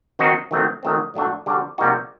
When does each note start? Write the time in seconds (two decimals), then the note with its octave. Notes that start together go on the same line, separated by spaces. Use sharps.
0.19 D#3 F#3 C4 D#4 F#4
0.51 D#3 F#3 A3 C4
0.83 D#3 F#3 A3 C4
1.14 A2 F#3 A3 D4 F#4
1.46 D3 G3 D4 F#4
1.78 C3 G3 A#3 D#4 F#4